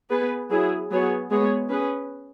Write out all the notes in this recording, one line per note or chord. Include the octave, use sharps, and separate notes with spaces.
B3 G#4 B4
F#3 E4 G#4
F#3 B3 G#4 C#5
G#3 B3 G#4 C#5
C#4 G#4 B4